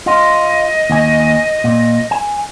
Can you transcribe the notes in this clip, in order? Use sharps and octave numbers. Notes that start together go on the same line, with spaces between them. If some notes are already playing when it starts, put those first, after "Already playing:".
F4 D#5
D#2 G#5
A#2
G#5